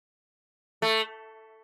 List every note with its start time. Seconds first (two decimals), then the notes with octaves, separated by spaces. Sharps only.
0.82 A3